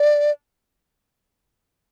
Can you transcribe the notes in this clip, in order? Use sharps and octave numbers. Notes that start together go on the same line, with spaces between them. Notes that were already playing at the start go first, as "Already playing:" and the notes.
Already playing: D5